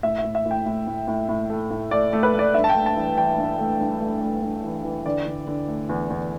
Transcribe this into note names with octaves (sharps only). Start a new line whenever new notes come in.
A2 E5
E5
A2
E5
A2
G5
A2
A2
A2
A2
A3
A2
A3 D5
A3
B4
A3 D5
G2 E5
A5
G5
A3
A5
E3
E3 G5
G2
A3
G2
A3
A3
G2
E3
E3
D3 D5
D3
D3
A3
E2
E2